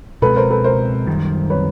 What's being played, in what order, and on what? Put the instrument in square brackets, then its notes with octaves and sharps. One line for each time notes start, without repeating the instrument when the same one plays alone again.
[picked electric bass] B2 G#3 C4 [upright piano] A4 B4
[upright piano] A#4 C5
A4 B4
A#4 C5
[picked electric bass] F#2 D#3 G3
[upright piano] B4 C#5